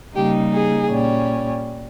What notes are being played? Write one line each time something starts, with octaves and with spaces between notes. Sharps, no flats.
C#3 G3 A#3 D#4 G4
G#4
A#2 G3 C#4